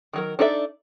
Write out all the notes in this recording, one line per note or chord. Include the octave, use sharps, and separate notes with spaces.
D#3 F#3 A#4
D4 D#4 A4 D5 E5